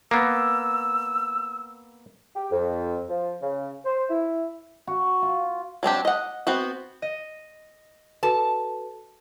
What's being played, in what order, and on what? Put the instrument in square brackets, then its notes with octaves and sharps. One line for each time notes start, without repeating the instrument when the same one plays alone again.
[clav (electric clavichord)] A#3 B3 [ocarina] E6
[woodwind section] G4
F2
F3
C#3
C5
E4
[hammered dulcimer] F#4
F4
[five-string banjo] F#3 C4 D4 G4
D#5 F#5
B3 C4 F#4
[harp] D#5
[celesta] F#4 A4 B4 [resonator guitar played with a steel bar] A5